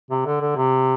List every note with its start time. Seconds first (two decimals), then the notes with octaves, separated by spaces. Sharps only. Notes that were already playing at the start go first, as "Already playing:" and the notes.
0.10 C3
0.26 D3
0.41 D3
0.56 C3